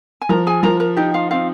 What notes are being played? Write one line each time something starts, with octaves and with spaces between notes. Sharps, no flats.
G#5
F3 A#4 A#5
G#4 G#5
F3 A#4 A#5
A#4 A#5
D#4 G4 G5
F4 F5
C4 F4 F5